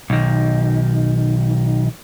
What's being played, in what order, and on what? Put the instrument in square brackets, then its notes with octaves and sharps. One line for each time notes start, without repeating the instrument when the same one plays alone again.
[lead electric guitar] B1 D#3